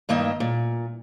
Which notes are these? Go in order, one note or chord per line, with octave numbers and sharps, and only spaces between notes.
G2 D#3 A#3 D#5 E5
A#2